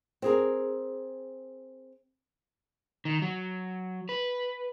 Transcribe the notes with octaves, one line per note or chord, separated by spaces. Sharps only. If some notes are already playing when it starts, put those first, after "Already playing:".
C4 G#4 A#4
D#3
F#3
B4